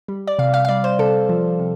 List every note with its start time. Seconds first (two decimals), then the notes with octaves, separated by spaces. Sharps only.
0.08 G3
0.27 D5
0.39 C3 F5
0.54 F5
0.65 F5
0.69 G3 D5
0.84 C5
0.99 C3 A4
1.29 F3
1.59 C3